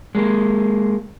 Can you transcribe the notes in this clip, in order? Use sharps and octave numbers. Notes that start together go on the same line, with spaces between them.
G#3 A#3